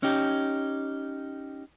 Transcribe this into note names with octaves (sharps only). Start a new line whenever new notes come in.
C#4 D#4 G4